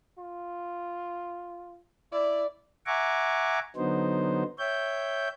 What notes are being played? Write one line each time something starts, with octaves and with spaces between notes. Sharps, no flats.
F4
E4 D5
E5 F#5 G#5 A#5 C#6 D6
D3 F#3 B3 D#4 C5
C#5 E5 G5 G6